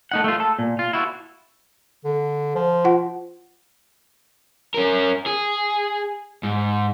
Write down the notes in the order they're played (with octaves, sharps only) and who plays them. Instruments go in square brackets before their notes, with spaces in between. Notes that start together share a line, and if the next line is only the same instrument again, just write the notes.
[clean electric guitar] A3 D#4 F#5
A3 F4
A4
A#2
F4
E4 F#4
[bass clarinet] D3
F3
[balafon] F4 F#5
[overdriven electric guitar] C#4 A#4
G#4
G#2